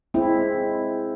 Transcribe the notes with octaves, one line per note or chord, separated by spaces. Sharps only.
G#3 C4 E4